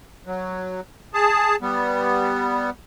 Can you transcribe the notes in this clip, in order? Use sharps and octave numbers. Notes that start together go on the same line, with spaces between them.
F#3
G#4 A5
G3 B3